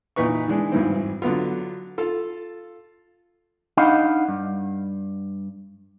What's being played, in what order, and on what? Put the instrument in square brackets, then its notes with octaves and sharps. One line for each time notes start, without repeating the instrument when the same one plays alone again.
[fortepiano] A#2 E3 D#4 B4 C#6
D#3 E3 G#3 D4
G#1 G2 E3 C4
D3 F#3 B3 F4
F4 A4
[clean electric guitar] D4 D#4 D#5 F5 F#5 B5
G2